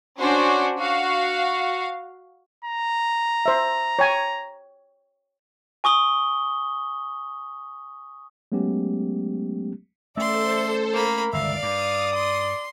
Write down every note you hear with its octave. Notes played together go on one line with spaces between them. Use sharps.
C#4 D4 F#4 C5
F#4 F5
A#5
C5 E5
C#5 G5 G#5
G#5 C#6 D#6 G7
F#3 G#3 A3 B3 C#4 G4
A3 C#4 A4 C5 D5 E5 C6
A#3 A#4 B5
G1 C#2 D#3 D5 E5 F5
G2 D5 D#6
C6